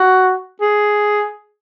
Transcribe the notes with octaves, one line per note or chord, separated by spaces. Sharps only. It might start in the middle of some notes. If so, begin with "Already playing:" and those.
Already playing: F#4
G#4